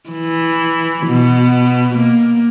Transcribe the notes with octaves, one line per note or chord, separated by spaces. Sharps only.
E3
B2
A#3